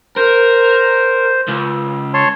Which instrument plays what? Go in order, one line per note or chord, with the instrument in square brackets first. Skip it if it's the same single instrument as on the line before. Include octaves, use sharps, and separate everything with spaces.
[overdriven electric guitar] A#4 [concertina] C5
[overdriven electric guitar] C#2
[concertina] C#5 A5 C6